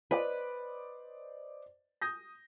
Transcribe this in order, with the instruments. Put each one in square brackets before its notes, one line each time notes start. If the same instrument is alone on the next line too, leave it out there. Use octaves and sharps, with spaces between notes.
[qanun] B4 [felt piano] C5 D5 D#5
[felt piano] D#6 G6 A#6